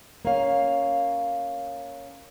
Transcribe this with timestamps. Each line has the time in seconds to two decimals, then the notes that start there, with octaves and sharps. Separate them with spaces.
0.25 A#3 C#4 F5